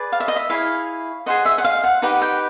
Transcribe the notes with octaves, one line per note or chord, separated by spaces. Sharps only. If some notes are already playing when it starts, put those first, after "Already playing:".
Already playing: G#4 B4 D5
F5
E5
D#5
E5
E4 G#4 C#5 F5
G#4 C5 D#5 F#5
E5
F#5
F5
F#5
D#4 G4 B4 D#5 F#5
G5